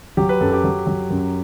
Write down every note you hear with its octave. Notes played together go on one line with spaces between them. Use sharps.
F#3 G4
B4
F#2 A4
G4
F#3
F#3
F#2